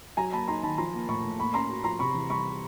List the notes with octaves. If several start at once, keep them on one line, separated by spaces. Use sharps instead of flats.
F#3 G#5 A#5
A#3 A5 B5
D#4 A#5 C6
D#3 A5 B5
F3 A#5 C6
A#3
A2 B5 C#6
A2
A#3 B5 C#6
C#4 A#5 C6
F#4
F3 A#5 C6
C3 B5 C#6
E3
G3 B5 C#6